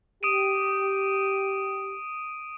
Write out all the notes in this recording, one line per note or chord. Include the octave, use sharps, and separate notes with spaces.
G4 D#6 D7 D#7